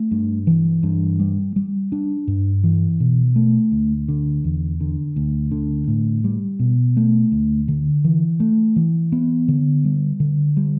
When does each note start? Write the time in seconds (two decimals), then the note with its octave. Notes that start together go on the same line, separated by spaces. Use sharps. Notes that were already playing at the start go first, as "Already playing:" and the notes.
Already playing: A3
0.11 G2
0.47 E3
0.83 G2
1.20 G3
1.56 G3
1.92 D4
2.28 G2
2.64 E3
3.00 B2
3.36 A3
3.72 D2
4.08 D3
4.44 E2
4.80 D3
5.16 D2
5.51 D3
5.88 A2
6.24 G3
6.59 B2
6.97 A3
7.32 D2
7.68 D3
8.04 E3
8.40 A3
8.76 E3
9.12 B3
9.48 D3
9.85 G3
10.20 D3
10.57 G3